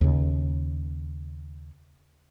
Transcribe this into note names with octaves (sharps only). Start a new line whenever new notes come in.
D#2 C#3